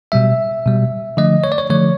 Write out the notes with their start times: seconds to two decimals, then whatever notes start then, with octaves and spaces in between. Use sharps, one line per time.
0.12 B2 G3 E5
0.66 B2 G3
1.17 D3 F3 A3 D#5
1.44 C#5
1.52 D5
1.58 C#5
1.70 D3 F3 A3 C#5